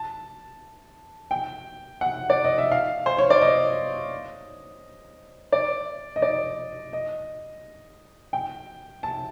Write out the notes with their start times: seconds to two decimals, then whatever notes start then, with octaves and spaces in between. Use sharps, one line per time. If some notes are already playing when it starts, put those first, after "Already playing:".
Already playing: A5
1.31 G5
2.01 F#5
2.30 D5
2.44 D#5
2.58 E5
2.72 F5
3.06 C5
3.19 C#5
3.30 D5
3.42 D#5
5.52 D5
6.16 D#5
6.22 D5
6.93 D#5
8.33 G5
9.03 A5